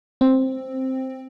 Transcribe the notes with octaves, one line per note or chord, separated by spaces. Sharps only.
C4